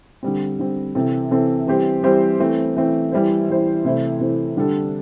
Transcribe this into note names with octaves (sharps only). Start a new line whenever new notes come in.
D3 G3 C4
D3 G3 C4
C3 E3 C4 A4
C3 E3 C4 A4
E3 G3 C4 G4 C5
E3 G3 C4 G4 C5
E3 A3 C4
E3 A3 C4
E3 G3 E4 C5
E3 G3 E4 C5
C3 E3 A3 E4 C5
C3 E3 A3 E4 C5
D3 G3 D4 A4